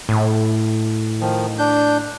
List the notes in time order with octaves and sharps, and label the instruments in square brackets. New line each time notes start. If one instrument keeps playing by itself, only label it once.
[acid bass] A2
[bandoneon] D#3 F3
D4 G6